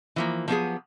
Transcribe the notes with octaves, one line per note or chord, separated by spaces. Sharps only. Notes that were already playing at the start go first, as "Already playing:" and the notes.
E3 F3 A#3
F3 F#3 B3 D4 G4 G#4